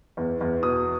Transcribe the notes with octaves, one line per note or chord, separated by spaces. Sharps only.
E2
E2
B2 D#6